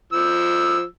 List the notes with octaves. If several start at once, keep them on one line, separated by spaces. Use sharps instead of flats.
F3 E6